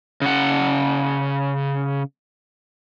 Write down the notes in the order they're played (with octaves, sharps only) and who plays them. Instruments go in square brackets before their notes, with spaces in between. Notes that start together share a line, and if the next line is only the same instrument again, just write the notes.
[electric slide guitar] C#3 F#5